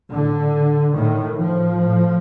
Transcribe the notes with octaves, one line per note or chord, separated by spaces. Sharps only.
A2 D3
A2 D#3
F3
A2